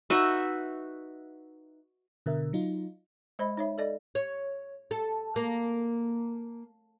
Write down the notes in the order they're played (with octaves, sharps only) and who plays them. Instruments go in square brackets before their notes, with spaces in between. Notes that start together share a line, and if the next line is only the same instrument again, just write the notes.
[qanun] D#4 F#4 B4 E5
[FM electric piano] B2 D3 A#4 E5
F#3 D#4 F4
[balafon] G#3 C5 D#5 B5
D#4 C#5 E5
A4 D5 D#5
[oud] C#5
A4
A#3